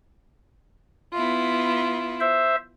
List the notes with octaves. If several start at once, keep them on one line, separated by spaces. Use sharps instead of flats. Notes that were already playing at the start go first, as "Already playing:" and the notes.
B3 E4 F4
C5 E5